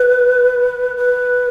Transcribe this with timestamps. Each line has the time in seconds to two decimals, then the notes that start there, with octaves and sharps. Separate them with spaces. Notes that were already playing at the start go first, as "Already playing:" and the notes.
Already playing: B4
0.97 B4